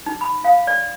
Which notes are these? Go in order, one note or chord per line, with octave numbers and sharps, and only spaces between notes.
D#4
B5
F5
D5